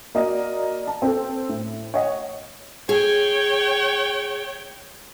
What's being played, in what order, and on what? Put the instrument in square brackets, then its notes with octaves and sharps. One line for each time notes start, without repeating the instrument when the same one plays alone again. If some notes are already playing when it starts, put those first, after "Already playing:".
[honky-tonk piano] A#3 F#4 D5 D#5
A5
C4 A4
A2
C#5 D#5 F#5
[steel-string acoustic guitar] G#4 [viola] C#5 G5